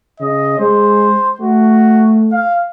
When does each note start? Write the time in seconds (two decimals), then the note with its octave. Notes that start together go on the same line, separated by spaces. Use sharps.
0.20 C#3 D#5
0.59 G#3 C5
1.40 A3 F#4
2.32 F5